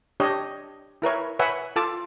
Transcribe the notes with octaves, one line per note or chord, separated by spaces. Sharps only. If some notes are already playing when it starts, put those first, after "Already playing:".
D4 G4 C#5 D#5
E4 A#4 B4 C#5
B4 C#5 E5 F#5 G#5
F4 A4 A5 D6